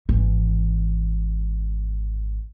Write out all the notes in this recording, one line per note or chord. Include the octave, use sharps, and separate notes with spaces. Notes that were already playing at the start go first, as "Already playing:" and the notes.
G#1 E3